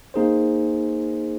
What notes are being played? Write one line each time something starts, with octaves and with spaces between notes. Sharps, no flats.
A#3 D#4 G#4 C5